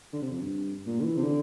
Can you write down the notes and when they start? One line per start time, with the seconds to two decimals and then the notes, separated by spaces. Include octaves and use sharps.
0.13 D3
0.22 C3
0.31 F2
0.41 G2
0.86 A#2
1.00 D3
1.04 E3
1.17 C3
1.23 D3